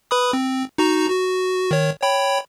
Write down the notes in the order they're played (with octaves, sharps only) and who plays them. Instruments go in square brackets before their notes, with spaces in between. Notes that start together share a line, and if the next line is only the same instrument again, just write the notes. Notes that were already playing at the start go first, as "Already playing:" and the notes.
[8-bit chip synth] B4 B5 D#6
C4
D#4 F#4 A#5
F#4
D#3 C#5
C#5 G5 B5